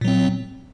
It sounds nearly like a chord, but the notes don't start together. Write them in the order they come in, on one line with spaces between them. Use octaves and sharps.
A#2 F#3 C4